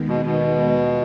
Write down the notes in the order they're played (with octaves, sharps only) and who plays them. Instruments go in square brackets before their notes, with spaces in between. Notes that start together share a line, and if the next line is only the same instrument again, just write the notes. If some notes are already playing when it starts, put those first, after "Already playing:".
Already playing: [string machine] D#2 D#3 G#3 B3
[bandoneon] B2
B2
[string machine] F4